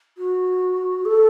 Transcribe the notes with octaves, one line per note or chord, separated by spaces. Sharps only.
F#4
A4